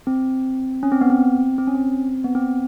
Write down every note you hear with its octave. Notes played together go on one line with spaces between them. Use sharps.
C4
C#4
C4
B3
C4
C4
C#4
C4
B3
C4